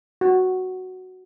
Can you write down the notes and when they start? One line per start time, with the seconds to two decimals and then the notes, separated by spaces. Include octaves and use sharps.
0.21 F#4